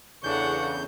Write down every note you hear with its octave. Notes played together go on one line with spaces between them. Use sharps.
E2 C#3 E3 D4 A4 F#5 C#6 G6